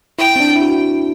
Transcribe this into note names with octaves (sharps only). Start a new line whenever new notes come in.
E4 G5
C4
D4
E4
F#4